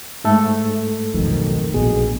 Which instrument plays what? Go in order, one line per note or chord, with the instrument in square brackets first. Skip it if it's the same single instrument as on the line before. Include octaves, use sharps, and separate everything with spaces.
[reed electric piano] G#2 A3 A4
[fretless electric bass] B1 F2 [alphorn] D#3
[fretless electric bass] A#1 B2 [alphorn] G#4